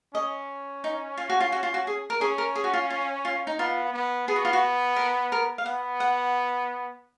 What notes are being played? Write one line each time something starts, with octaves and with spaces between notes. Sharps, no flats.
C#4 D#5
D#4
F4
F#4
F4
F#4
F4
F#4
G#4
A#4
C#4 G#4
A#4
G#4
F#4
F4
F4
F4
D#4
B3 F4
B3
B3 G#4
F#4
F4
F#4
A#4
A#4
F5
B3 F#5
F#5